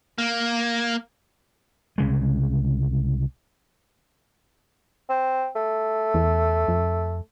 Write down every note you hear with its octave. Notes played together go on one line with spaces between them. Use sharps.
A#3
C2 C#3 G#3
C4
A3
E2
F2